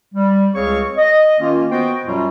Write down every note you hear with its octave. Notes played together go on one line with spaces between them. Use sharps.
G3
C#2 C4 G#4 C#5 F5 C#6
D#5
D#3 A#3 C#4 F4
B3 F#4 C5 D#5 G5
F#2 B2 F#3 G3 C#4 F4